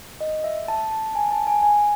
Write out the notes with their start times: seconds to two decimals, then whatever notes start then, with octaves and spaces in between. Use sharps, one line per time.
0.20 D#5
0.44 E5
0.68 A5
0.92 A5
1.15 G#5
1.31 A5
1.47 G#5
1.62 G#5